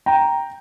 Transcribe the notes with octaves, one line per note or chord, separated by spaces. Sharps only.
G5 A#5